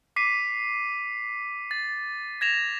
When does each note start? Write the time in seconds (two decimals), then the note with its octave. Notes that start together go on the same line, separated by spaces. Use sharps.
0.16 D6 B6 C7 D#7
1.71 A6
2.41 G#6 A#6 E7 F7